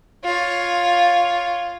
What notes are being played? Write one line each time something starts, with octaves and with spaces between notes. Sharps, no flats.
F4 C#5